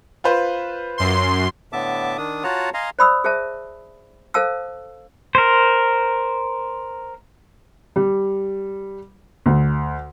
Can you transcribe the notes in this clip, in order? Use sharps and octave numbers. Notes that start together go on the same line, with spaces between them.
F4 B4 C5
F#2 C6
A2 D3 B3 E5 A5 D6
D#3 D4 D#6
F4 F#4 C#5 F#5 A5 A#5
D#5 F5 G#5 A#5 C6
C5 D5 B5 D#6 E6
G#4 C5 E5 A5
A4 C5 F5 A5 E6
A#4 C5
G3
D2